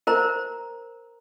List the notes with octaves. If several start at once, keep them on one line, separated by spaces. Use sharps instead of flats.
A#4 C5 A#5